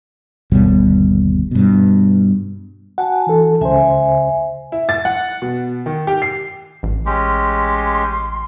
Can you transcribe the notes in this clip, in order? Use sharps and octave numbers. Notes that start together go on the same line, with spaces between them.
G1 D#2 B2 G3
G2 B2
F#4 F#5 G#5 A5
E3 A4
C#2 C#3 C5 E5 G#5
E4
A6
F#5
B2
D#3
G4
C7
A1
G#3 C#4 G4 C6